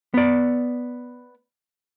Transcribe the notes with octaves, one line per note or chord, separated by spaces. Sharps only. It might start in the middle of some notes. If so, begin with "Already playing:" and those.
B3 D5